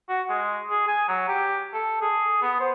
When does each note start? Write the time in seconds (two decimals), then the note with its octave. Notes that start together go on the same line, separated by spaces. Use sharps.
0.09 F#4
0.29 G#3
0.70 G#4
0.88 G#5
1.08 F#3
1.28 G4
1.74 A4
2.02 G#4
2.42 B3
2.60 C5